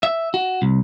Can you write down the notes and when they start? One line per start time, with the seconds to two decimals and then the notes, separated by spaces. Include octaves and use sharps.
0.03 E5
0.34 F#4
0.62 C2